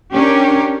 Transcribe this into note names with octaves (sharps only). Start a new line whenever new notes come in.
C#4 D4 G4 A#4